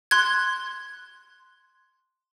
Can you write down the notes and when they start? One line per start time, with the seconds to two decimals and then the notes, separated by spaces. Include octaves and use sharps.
0.11 C6 F#6 G#6